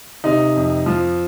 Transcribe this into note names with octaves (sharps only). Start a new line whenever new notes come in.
C3 D#4
F2
F3